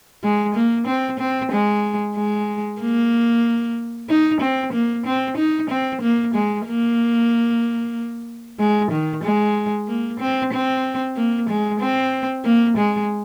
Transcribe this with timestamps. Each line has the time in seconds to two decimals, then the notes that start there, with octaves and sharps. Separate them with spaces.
0.24 G#3
0.55 A#3
0.87 C4
1.20 C4
1.52 G#3
2.16 G#3
2.81 A#3
4.09 D#4
4.41 C4
4.73 A#3
5.06 C4
5.37 D#4
5.70 C4
6.02 A#3
6.34 G#3
6.67 A#3
8.59 G#3
8.91 D#3
9.24 G#3
9.88 A#3
10.20 C4
10.53 C4
11.16 A#3
11.49 G#3
11.80 C4
12.45 A#3
12.77 G#3